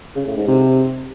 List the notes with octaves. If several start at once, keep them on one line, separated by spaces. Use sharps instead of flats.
C#3
A2
G#2
C3